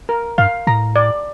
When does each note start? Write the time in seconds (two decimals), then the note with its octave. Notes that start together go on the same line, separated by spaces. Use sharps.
0.09 A#4
0.38 G2 F5
0.67 A2 A#5
0.96 D5